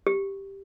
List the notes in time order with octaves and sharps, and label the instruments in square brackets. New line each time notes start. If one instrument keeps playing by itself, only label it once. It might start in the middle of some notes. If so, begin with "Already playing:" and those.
[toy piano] G4